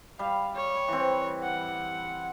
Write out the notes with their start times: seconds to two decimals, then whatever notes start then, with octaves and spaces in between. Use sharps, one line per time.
0.19 G3 F5
0.55 C#5
0.88 E3 C4
1.43 F#5